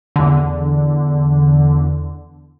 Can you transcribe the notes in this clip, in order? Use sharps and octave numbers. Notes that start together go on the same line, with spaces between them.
E2 D3